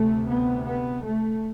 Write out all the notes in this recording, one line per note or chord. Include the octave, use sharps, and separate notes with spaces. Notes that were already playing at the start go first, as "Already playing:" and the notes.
Already playing: D2 C3 A3
B3
B3
A3